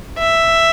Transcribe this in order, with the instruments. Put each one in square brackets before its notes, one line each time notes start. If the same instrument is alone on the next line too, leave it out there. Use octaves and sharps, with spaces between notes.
[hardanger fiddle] E5